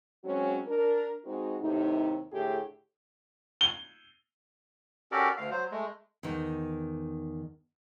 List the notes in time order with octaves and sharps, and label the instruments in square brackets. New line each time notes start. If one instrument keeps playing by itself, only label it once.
[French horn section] F#3 G#3 C4 C#4 F#4
D4 A#4
G#3 C4 D#4 F#4
D#2 A2 C3 D#4
A2 D3 A3 G4 G#4
[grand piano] G7
[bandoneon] C#4 F#4 G4 A4 A#4 D5
D2 F5
F#3 C5
G#3 A3
[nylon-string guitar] E2 D#3